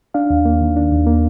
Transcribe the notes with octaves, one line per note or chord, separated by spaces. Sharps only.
D4 F5
D#2
A#3
D#3
D4
D#2
A#3